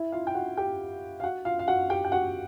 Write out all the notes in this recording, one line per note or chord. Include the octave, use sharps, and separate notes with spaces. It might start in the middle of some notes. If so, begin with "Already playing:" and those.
Already playing: E4 E5
F4 F5
G5
F#4 F#5
G4 G5
F5
F#4 F#5
F4 F5
F5
F#4 F#5
G4 G5
G5
F#4 F#5